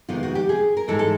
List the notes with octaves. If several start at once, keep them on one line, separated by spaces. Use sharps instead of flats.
F2 C3 D#3 G#3 B3 F4
F#4
G4
G#4
A#4
G#2 E3 G#3 A4
A4